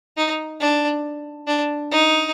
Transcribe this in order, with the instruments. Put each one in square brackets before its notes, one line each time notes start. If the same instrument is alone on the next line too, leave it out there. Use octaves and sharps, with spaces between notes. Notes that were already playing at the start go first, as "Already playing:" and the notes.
[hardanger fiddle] D#4
D4
D4
D#4